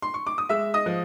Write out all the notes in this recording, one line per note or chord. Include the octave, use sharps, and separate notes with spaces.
C6
C#6
D6
D#6
G#3 E5 E6
D#5 D#6
F3